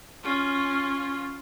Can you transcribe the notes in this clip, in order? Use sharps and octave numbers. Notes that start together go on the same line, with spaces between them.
C#4 F4